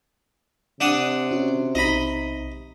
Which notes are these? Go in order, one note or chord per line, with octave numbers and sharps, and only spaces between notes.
C3 D4 F#5 D#6
C#4 F#4
B1 D#4 D#5 A#5 B5